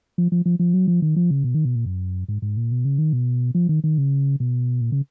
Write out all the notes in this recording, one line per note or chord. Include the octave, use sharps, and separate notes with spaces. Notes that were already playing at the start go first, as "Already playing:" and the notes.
F3
F3
F3
F3
F#3
F3
D#3
F3
C#3
B2
D#3
B2
A#2
F#2
G#2
G#2
A#2
B2
C#3
D#3
B2
F3
D#3
D#3
C#3
B2
A#2
C#3